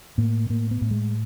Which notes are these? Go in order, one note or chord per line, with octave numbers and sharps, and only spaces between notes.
A2 A#3
A2 A#3
B3
A2
G#3